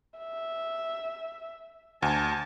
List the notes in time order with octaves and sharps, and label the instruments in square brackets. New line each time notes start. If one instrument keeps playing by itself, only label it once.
[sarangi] E5
[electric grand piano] D2 G#6 [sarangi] A5